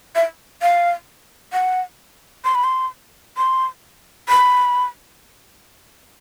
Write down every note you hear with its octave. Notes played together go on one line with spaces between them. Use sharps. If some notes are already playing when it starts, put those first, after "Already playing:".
E5
F5
F#5
C6
B5
C6
C6
B5